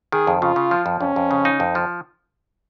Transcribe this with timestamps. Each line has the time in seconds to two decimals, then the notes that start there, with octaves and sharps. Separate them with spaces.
0.12 D#3 G#4
0.27 F2
0.42 C#3 F4
0.56 C#3
0.71 F3
0.86 F2
1.01 F2 C#4
1.16 F2
1.31 C#3
1.45 D#4
1.60 F2
1.75 F3